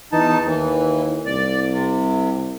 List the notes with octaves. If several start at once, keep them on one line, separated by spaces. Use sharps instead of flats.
E2 E3 D#4 A5
D#2 E3
C2 D5
C3